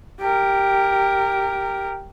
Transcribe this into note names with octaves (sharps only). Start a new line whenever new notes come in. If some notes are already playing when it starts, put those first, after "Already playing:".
G4 A#4